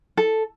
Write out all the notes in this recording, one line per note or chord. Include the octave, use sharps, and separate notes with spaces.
A4